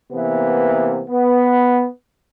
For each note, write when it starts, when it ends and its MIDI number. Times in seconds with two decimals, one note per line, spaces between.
0.12 1.01 48
0.12 1.01 52
0.12 1.01 58
0.12 1.01 59
1.09 1.86 59